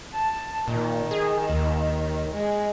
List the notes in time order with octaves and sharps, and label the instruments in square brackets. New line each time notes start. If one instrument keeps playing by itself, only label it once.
[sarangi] A5
[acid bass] A#2 [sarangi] D#3
[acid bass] G#4
D#2
[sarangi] G#3